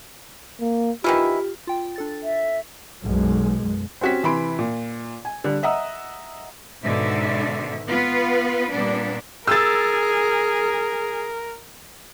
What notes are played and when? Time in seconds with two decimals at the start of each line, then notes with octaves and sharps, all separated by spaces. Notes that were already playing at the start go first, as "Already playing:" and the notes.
0.60 A#3
1.04 D#3 E3 E4 F4 G4
1.67 F4 G5
1.96 D4 A4 A6
2.23 E5
3.03 B1 F#2 B2 G#3
4.01 C4 C#4 F#4 G4 B6
4.23 C3 E3 B5 C6 D7
4.59 A#2
5.25 G#5
5.44 D3 G3 F#6
5.63 D#5 E5 F#5 A#5 D#6 E6
6.82 G#2 B2 D3 D#3 E5
7.87 B3 F4 B4
8.69 A#2 G3 B3 D4
9.47 G#4 A#4 E6 A6